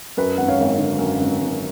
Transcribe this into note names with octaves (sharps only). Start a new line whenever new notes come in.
F#2 B4
G#1 F#5
C#5 F5
G#1
D3
F#2
G#1
G#1